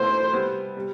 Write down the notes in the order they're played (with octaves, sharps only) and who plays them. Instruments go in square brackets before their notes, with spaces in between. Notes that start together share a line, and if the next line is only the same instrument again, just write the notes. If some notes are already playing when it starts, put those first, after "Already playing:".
Already playing: [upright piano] B2 A3 E4 B4 [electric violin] C5
[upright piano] C3 G3 B3
C3 G3